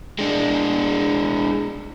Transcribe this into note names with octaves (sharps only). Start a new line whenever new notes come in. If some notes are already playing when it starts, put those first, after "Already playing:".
G#3 D4